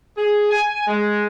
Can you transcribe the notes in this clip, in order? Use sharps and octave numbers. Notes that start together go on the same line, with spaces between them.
G#4
G#5
G#3